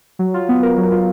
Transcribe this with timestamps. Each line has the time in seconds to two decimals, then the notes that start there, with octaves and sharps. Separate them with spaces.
0.19 F#3
0.34 F4
0.49 B3
0.63 A#4
0.77 F#3
0.92 F4